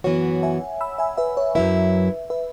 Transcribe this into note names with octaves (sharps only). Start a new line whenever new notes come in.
F#2 E3 B3 F#4 C#5 F#5
E5 G#5
B5 E6
E5 G#5
B4 E5
C#5
F#2 F#3 E4 B4 E5
B4 E5